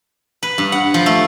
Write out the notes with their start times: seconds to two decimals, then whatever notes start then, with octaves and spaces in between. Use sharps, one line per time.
0.43 B4
0.58 G2
0.72 F#5
0.94 F3
1.06 A3